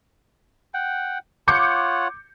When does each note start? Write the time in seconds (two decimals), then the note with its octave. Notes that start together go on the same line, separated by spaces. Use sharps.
0.74 F#5 G5
1.48 F4 C#5 F#5 D6 G6 C#7